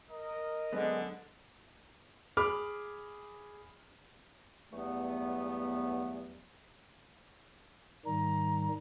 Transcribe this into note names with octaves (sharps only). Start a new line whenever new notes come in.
A#4 D#5
F#2 D3 G#3 B3 D4
G#4 B5 D6 F6
E2 G2 F#3 A3 B3
G#2 D#3 G3 A#5